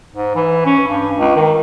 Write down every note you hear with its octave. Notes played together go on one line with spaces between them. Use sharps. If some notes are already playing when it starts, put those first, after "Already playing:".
G#2
E3
C#4
G2
C#2
D#3